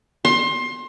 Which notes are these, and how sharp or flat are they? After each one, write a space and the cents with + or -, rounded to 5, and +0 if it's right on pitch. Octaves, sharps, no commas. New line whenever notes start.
C6 +25